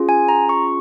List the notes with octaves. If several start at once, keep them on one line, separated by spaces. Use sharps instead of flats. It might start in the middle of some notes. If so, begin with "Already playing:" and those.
Already playing: C#4 F4 G#4
G#5
A#5
C#6